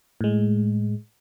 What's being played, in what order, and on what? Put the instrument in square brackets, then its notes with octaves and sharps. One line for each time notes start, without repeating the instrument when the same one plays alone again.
[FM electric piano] A2 G#3